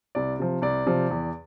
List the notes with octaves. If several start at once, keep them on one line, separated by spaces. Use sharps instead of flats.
C2 D5
C3 F3
C2 D5
C3 F3
E2